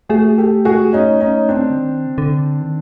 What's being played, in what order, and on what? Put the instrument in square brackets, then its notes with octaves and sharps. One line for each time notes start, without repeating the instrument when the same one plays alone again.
[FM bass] A3 [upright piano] F#4 G#4
[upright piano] G4 A4
F#4 G#4
C#4 D#4
C#4 D#4
C4 D4
[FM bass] D3
D#3
C#3
D3
D#3